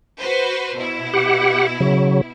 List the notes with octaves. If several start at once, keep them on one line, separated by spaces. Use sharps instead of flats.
F#4 B4 C5
B2 E4
G4 F#5
C#3 F#3